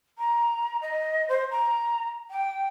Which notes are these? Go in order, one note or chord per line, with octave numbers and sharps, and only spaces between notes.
A#5
D#5
C5
A#5
G5